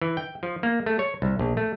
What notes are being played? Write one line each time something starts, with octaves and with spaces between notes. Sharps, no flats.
E3
G5
F3
A#3
A3
C#5
C2
A#1
A3